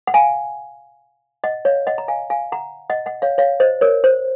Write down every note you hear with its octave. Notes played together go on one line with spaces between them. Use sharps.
F#5
F5 G#5
D#5 F#5
C#5 F5
D#5 F#5
A#5
F5 G#5
F5 G#5
F#5 A#5
D#5 F#5
D#5 F#5
C#5 F5
C#5 F5
C5 D#5
A#4 C#5
C5